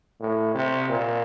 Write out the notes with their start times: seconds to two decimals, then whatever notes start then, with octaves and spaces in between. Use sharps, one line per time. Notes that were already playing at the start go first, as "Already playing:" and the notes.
0.20 A2
0.55 C3
0.89 A#2